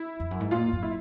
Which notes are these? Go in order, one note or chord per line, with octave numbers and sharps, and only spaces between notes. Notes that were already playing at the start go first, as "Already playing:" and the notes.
Already playing: E4
F2
F#2
G#2
A#2 F4
F#2
E4